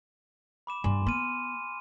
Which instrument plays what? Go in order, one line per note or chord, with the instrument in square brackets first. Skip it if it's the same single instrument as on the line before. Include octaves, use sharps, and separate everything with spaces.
[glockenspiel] B5 D6 E7
[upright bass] G2 [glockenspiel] G#5 C6
[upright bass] B3 [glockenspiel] C6 F6 D#7